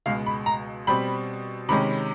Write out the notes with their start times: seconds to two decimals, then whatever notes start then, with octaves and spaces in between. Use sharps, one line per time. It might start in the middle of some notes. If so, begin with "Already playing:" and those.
0.06 C#2 B2 G#3 F5
0.26 B5
0.46 A#5
0.87 B2 G3 C4 B5
1.69 C3 D#3 G#3 C#4 B5